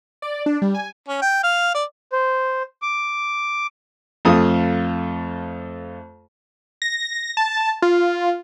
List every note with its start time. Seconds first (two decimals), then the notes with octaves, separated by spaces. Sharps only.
0.22 D5
0.46 D4
0.62 G3
0.74 G#5
1.08 C#4
1.22 G5
1.43 F5
1.74 D5
2.13 C5
2.82 D6
4.25 F2 A3 F4 F5 D#6
6.82 A#6
7.37 A5
7.82 F4